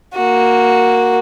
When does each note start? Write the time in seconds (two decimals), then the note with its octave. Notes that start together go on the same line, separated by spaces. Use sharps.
0.15 A#3 F#4